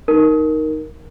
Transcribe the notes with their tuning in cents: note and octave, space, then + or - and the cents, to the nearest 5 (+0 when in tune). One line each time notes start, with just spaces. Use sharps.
D#4 +0 A#4 +0